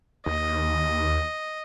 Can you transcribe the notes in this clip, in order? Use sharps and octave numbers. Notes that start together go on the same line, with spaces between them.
D#2 D#5